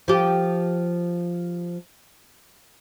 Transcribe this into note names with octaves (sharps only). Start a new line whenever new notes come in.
F3 G4